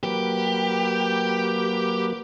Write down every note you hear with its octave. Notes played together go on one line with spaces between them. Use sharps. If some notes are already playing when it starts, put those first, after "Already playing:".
F#3 A#3 G4 B4